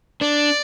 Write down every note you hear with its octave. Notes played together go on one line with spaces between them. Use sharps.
D4 D5